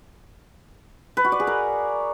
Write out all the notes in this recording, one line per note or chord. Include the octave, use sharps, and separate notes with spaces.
B4
F#4
D5
G#4
A#4